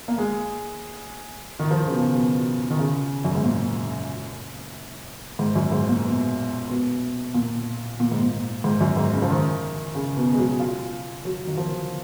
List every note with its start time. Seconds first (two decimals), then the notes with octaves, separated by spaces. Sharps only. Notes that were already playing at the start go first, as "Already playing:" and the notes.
0.08 A#3
0.18 G#3
1.59 D#3
1.71 F3
1.87 C#3
1.92 B2
2.14 B2
2.71 D#3
2.79 C#3
3.24 F#2
3.35 G#2
3.44 A#2
5.39 G#2
5.55 F#2
5.72 G#2
5.88 A#2
6.04 B2
6.69 B2
7.34 A#2
8.00 A#2
8.11 G#2
8.23 A#2
8.64 G#2
8.81 F#2
8.97 G#2
9.13 C#3
9.22 F3
9.30 D#3
9.95 C#3
10.16 B2
10.34 G#3
10.38 F#3
10.60 F4
11.25 F#3
11.47 D#3
11.57 F3